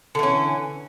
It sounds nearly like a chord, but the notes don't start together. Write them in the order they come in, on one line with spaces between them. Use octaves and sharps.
D3 E3 C#4